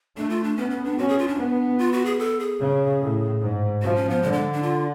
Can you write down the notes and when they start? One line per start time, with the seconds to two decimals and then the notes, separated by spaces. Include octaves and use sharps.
0.17 A3 D4
0.30 F4
0.44 D4
0.57 B3 C#4
0.70 C#4
0.84 D4
0.98 C#4 F#4
1.09 G#4
1.19 F4
1.28 D4
1.38 B3
1.79 F4
1.93 F#4
2.05 G#4
2.19 A4
2.40 G#4
2.61 C#3
3.01 A2
3.42 G#2
3.82 F3 F#4
3.96 C#4
4.09 B3
4.23 D3 G#3
4.33 G#3
4.53 D4
4.63 F4